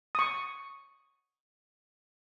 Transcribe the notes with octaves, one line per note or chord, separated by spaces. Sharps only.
C#6 D#6